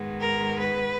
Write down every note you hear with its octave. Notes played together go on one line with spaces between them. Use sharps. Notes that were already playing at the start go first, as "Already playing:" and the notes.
Already playing: G#2 D#3 G#3 B3
A#4
B4